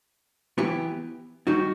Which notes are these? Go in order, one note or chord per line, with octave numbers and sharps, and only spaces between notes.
E3 B3 E4 G4
D#3 G3 D#4 F#4